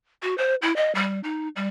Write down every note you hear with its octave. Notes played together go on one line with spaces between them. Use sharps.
F#4
C5
E4
D#5
G3
D#4
G3